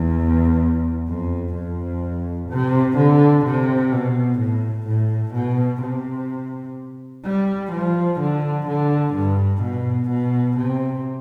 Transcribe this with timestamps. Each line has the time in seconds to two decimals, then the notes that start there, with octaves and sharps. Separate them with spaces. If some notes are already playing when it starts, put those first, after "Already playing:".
Already playing: E2
1.08 F2
1.54 F2
2.50 C3
2.98 D3
3.45 C3
3.92 B2
4.39 A2
4.87 A2
5.34 B2
5.82 C3
7.25 G3
7.73 F3
8.20 D3
8.67 D3
9.14 G2
9.63 B2
10.10 B2
10.57 C3